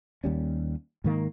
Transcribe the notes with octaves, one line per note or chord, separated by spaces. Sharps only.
D#2 G3 C#4
G#2 D#3 A#3